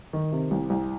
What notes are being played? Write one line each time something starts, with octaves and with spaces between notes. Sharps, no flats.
D#3
C3
C2
C2